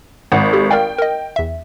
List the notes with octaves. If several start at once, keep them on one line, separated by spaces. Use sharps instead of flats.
G#1 F#5
G4 A4
A#4 D5 F5 G5
A#4 D#5
E2 E5